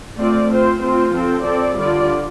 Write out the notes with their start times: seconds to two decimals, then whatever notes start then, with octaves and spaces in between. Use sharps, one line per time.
0.18 A3 C4 F4 D5
0.50 C4 F4 C5
0.82 A3 C4 F4 C5
1.13 F3 C4 A4
1.45 C4 A4 D5
1.77 D3 G3 F4 D5